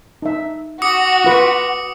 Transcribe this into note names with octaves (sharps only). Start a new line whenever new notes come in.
D#4 E5
F#4 D6 D#6 C#7
F4 B4 C#6